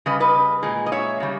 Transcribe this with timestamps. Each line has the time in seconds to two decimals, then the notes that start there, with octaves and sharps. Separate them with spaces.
0.06 C#3 G3 B4 D#5
0.20 B4 D#5
0.63 A#2 G#3
0.86 D#5
0.92 C#5 E5
1.20 C#3 G3